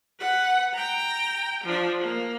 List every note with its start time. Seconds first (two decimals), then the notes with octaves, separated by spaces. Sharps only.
0.19 B4 F#5
0.73 G5 A#5
1.63 F3 D4
2.00 A#3